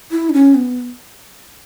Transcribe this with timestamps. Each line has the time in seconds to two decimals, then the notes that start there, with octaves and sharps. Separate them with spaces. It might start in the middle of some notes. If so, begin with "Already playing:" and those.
0.11 E4
0.29 D4
0.33 C#4
0.55 B3